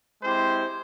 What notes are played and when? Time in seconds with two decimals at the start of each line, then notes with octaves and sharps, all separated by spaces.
0.23 G#3 C4 E4 G4 C5